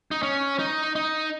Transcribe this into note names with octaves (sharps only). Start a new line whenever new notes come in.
D#4
C#4
D#4
D#4